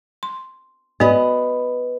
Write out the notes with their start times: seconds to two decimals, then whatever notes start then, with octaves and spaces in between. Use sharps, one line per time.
0.23 C6
1.00 B3 F#4 B4 D5 D#5